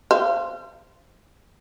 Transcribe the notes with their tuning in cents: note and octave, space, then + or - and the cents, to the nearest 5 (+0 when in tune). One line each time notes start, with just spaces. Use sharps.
C5 +0 F5 -35